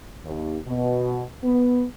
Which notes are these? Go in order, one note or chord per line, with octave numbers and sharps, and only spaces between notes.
D#2
B2
B3